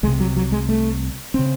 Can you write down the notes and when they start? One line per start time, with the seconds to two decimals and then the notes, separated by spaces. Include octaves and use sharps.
0.03 C2 G#3
0.07 C3
0.20 F#3
0.37 F#3
0.52 G#3
0.69 A3
1.34 C#3 C4